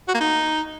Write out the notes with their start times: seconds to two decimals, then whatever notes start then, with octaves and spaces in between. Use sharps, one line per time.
0.08 F#4
0.14 A#3
0.21 D#4